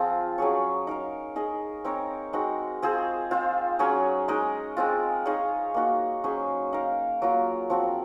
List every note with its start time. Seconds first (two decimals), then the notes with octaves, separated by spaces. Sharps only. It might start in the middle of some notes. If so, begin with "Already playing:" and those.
Already playing: F3 C4 F4 G#4
0.38 F#3 C#4 G#4 C#5
0.87 D#4 A#4 F5
1.36 D#4 G#4 D#5
1.85 C4 D#4 A#4 C#5
2.33 G#3 C4 D#4 F#4
2.82 C4 F4 G#4 C5
3.31 C4 F4 C5 F5
3.79 F#3 C#4 G#4 C#5
4.28 G#3 D#4 A#4 D#5
4.77 G#3 C4 F4
5.25 D#4 G#4 C#5 F5
5.74 A#3 D#4 F#4
6.24 F#3 C#4 G#4 C5
6.73 D#4 A#4 F5
7.22 F#3 A#3 F4 A#4
7.70 F3 C4 F#4